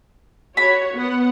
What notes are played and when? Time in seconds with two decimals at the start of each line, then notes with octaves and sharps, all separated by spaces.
0.57 F#4 C#5 B5
0.94 B3 F#5